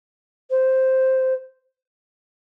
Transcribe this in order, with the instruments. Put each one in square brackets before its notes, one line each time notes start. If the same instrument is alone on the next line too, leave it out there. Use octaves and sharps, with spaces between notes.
[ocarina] C5